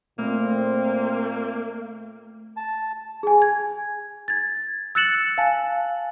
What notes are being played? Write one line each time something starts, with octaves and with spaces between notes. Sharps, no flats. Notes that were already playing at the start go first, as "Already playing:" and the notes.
A#2 A3 A#3 C4
A5
G#4 G#5
G#6
G#6 A6
E6 F#6 A6 C#7 E7 F#7
F5 G#5 A5